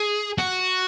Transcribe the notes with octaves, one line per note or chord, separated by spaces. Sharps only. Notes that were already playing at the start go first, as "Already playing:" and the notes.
Already playing: G#4
F#4